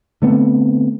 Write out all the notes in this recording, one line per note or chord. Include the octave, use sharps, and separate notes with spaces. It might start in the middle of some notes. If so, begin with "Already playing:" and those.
D3 A3 B3 C4